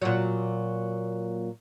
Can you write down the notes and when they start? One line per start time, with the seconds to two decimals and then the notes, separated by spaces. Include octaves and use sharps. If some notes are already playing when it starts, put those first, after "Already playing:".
0.02 A#2 F#3